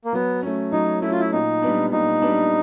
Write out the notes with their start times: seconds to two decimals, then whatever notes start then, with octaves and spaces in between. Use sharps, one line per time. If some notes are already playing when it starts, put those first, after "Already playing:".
0.05 A#3
0.13 F#3 B3
0.43 A3 C#4
0.72 F#3 D#4
1.02 A3 C#4 E4
1.12 F4
1.20 E4
1.32 A#2 D#4
1.62 G3 B3 D4
1.92 A#2 D#4
2.22 G3 B3 D4